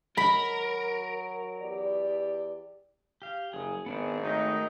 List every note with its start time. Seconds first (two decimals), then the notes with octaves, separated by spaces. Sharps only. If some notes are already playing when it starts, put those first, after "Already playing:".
0.17 F#3 A#4 B5
1.59 E2 G4 D5
3.22 G4 F5
3.53 F#1 F#3 G#4
3.86 G#1 B3 D4 G#4
4.22 D#3 F#3 A3 D#4